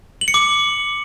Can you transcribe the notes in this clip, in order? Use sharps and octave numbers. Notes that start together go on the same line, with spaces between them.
F#7
C#7
D6